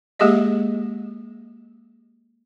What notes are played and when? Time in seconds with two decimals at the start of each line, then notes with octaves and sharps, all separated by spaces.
0.19 G#3 A#3 G4 G#4 D#5 E5